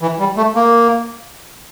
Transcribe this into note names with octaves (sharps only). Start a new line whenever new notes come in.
E3
G3
A3
A#3